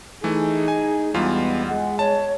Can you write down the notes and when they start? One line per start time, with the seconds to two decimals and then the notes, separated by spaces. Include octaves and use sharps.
0.24 E3 A3 D#4 G#4
0.68 G#5
1.14 E2 G3 G#3 B3 F4
1.67 G#3 F#5
1.99 C#5 A5